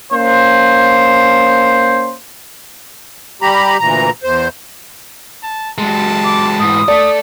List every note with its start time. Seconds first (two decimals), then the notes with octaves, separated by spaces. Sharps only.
0.12 A#3 C#4 C5
3.42 G3 G4 A#5 B5
3.79 D2 A#2 E3 A#5
4.23 E2 C5
5.43 A5
5.78 F#3 G#3 A5
6.24 D6
6.59 G#2 E3 D#6
6.88 A3 A4 D5